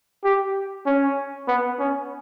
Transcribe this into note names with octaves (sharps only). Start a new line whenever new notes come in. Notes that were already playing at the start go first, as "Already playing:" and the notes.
G4
C#4
B3
C#4